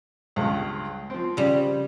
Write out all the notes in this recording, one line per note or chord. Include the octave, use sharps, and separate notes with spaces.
C#2 G2 C#3
F3 C4
C#3 G3